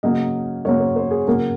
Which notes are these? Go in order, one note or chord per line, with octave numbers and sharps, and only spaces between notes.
C#3 F#3 A#3 D#5
C#3 F#3 A#3 C#5
C5
C5
G#4
C#3 F#3 A#3 A#4